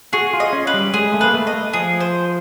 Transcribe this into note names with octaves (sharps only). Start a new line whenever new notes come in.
F#4 G#4
F4
D#5
C#4
B4
G3
G#3 G#4
A3
A#3 B4
A3
D#5
A3
F3 G#4
C5